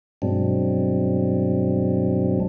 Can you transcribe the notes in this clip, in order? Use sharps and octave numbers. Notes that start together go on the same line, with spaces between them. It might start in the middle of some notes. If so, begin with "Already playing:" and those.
G2 B2 F#3 G#3 C4 D4